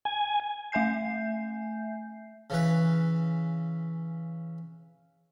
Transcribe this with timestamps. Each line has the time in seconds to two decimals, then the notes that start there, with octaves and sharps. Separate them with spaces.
0.05 G#5
0.72 A3 E5 G#5 G6 C7
2.50 C#3 E3 B4